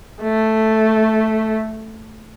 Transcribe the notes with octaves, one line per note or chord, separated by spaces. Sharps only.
A3